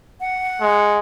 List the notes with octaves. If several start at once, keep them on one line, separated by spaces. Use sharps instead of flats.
F#5
G#3